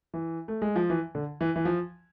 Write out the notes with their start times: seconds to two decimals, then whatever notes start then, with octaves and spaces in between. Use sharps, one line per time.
0.14 E3
0.48 A3
0.62 G#3
0.76 F3
0.90 E3
1.15 D3
1.41 E3
1.56 E3
1.65 F3